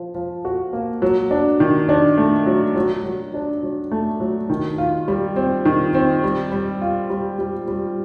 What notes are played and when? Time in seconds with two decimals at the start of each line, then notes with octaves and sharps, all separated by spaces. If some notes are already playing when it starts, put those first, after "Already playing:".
Already playing: F3
0.15 F3
0.45 F#4
0.73 A#3
1.02 F#3
1.31 D4
1.60 D#3
1.89 D4
2.18 A3
2.46 F#3
2.76 F#3
3.05 F#3
3.34 D4
3.63 F#3
3.91 A3
4.20 F#3
4.50 D#3
4.78 F4
5.08 G3
5.36 C4
5.65 D#3
5.94 C4
6.23 G3
6.52 G3
6.82 F4
7.10 G3
7.39 G3
7.68 G3